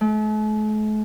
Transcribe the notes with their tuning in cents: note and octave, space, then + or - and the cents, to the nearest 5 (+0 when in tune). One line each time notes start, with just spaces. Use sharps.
A3 -45